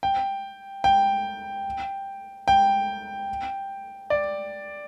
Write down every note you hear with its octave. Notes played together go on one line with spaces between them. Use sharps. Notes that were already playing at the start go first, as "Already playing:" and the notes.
G5
G5
G5
D5